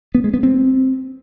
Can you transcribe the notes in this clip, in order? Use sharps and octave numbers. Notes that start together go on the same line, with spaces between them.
B3
G#3
B3
C4